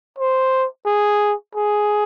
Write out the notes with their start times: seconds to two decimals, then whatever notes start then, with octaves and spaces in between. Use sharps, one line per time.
0.18 C5
0.86 G#4
1.55 G#4